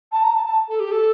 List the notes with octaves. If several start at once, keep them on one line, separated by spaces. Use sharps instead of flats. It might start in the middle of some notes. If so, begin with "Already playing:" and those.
A5
A#5
A5
A5
A4
G4
A4